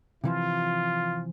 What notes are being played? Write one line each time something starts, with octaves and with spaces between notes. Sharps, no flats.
C3 E3 F3 F4